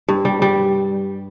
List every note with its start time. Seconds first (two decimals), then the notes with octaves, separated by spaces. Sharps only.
0.08 G2
0.25 G3
0.42 G3